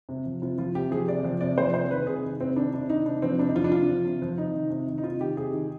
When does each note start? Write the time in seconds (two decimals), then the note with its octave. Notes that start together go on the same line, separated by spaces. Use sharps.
0.09 C3
0.25 F3
0.42 C3 F4
0.58 F3 F4
0.75 C3 G4
0.91 F3 G#4
1.08 C3 D5
1.24 F3
1.41 C3 D5
1.58 F3 C5
1.74 C3 C5
1.91 D#3 B4
2.07 C3 G#4
2.23 D#3
2.40 C3 C4
2.56 D#3 D4
2.73 C3 D4
2.89 D#3 D#4
3.05 C3 D4
3.22 F3 C4
3.39 C3 D4
3.47 D#4
3.55 F3 F4
3.64 D4
3.72 C3 F4
3.89 F3
4.05 C3
4.22 F3
4.38 C3 D#4
4.55 D#3
4.70 C3
4.88 D#3
4.98 D#4
5.04 C3 F4
5.21 D#3 G4
5.37 C3 G#4
5.53 D#3